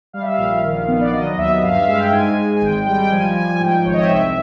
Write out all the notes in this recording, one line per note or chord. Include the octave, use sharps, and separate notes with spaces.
G3 F5
E5
F5
A#1
D#3
B3
D5
F#3 D#5
D#2 E5
G2 F5
E5
G#3 F5
G5
G#2 G#5
G#3
G#5
G#1 G5
G3 G5
G5
F3 G#5
F3 G#5
G#5
G#2 G5
G#1 C#5
D#5
E5
C2 E5